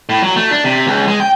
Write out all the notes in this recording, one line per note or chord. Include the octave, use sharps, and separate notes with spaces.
A2
F#3
A3
D4
C3
C#2
G#3
G5